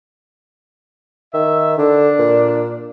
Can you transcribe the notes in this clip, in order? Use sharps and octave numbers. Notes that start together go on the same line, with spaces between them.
D#3 E5
D3 D4
A#2